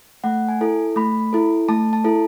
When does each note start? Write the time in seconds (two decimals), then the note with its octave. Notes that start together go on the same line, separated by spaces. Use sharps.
0.24 A3 F#5
0.49 G#5
0.61 E4 A4
0.96 A3 B5
1.33 E4 A4
1.69 A3 A5
1.93 A5
2.04 E4 A4